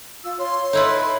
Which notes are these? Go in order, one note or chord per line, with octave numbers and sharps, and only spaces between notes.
F4 E6
F4 C#5 C6
D#4 E4 A4 B4
B5